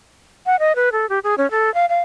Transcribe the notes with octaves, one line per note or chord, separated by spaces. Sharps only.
F#5
D#5
B4
A4
G4
G#4
C#4
A4
F5
F5